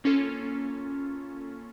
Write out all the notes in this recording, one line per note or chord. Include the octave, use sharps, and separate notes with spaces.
A#3 C#4 F4 A4